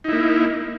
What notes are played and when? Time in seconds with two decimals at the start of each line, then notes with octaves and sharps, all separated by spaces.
0.04 D#4
0.08 E4
0.12 A#3